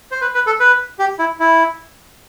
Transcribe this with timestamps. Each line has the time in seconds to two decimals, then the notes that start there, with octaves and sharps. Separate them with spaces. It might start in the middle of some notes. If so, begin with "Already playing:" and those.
0.11 C5
0.21 B4
0.35 B4
0.47 A4
0.60 B4
0.99 G4
1.19 E4
1.40 E4